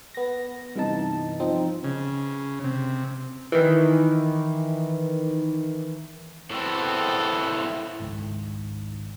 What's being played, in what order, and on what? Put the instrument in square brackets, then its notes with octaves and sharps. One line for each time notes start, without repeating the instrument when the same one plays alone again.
[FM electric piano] B3 A#6
G2 C3 E3 B3 D#4 A5
F3 C4 D#4
[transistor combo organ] C#3
C3
[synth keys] D#3 E3
[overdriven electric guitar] A2 C4 [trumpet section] B3 A4
[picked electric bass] G#1 C#2 G#2